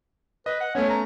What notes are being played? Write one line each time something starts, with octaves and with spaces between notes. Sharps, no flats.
B4 D#5
F#5
A3 B3 C#4 C#5
A#5